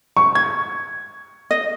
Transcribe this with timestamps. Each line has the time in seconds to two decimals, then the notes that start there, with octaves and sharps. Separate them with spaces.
0.17 C#6
0.35 G#6
1.51 D#5